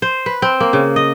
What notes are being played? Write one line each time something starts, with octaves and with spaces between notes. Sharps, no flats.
C5
B4
C4
A#3
C#3
D#5